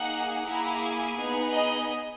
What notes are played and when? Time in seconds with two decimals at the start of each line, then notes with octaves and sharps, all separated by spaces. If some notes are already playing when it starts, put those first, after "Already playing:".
Already playing: A#3 D#4 G#4 F#5
0.46 A#3 E4 G#4 A#5
0.82 G#5
1.18 B3 D#4 G#4
1.53 D#5